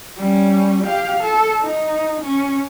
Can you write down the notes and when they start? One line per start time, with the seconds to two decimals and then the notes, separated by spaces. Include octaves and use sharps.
0.18 G3 C#4
0.83 G4 F5
1.20 A4
1.61 D#4
2.22 C#4